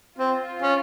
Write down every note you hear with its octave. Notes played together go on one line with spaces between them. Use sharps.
C4 F4
C#4